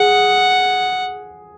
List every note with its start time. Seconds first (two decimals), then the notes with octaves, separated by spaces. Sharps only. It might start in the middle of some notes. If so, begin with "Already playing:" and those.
Already playing: G#4 F#5